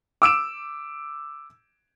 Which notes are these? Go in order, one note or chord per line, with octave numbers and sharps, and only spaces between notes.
D6 E6 D7 E7